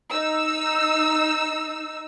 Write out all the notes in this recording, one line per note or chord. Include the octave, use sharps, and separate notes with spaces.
D#4 E6